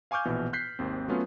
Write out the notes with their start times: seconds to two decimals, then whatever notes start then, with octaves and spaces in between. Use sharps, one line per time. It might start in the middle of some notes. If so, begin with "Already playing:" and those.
0.11 F5 G#5 C#6 D6 F6 G6
0.25 A#1 B2 E3
0.53 F#6 G6 B6 C7
0.79 G#1 D#2 C4
1.08 F#3 A3 B3 C#4 F4